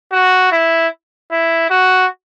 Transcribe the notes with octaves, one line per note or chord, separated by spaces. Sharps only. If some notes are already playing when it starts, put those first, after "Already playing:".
F#4
E4
E4
F#4